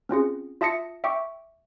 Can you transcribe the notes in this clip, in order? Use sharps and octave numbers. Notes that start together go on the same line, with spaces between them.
C4 C#4 F4 G#4
F4 E5 A5 D#6 A#6 C#7
E5 G5 C#6 D6